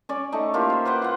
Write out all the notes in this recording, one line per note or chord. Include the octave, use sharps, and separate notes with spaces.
C#4 D5
A3 D#4 A4 A5
A#3 E4 F4 G4
C5
B4 C5 F#5 G5
F4 F#5